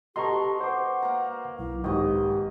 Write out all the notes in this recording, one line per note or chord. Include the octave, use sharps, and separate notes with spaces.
B2 G4 A4 D#5 A#5 C6 C#6
C5 F#5 D6
A#3 A#5
B1 E4
G#1 G4 D#5 C#6